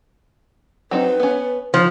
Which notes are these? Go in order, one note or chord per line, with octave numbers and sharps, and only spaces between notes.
F#3 C4 D#4 B4
B3 C#4
F3 D#4 C5